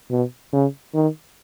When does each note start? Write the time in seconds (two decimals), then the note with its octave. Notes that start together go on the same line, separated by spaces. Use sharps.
0.11 B2
0.53 C#3
0.94 D#3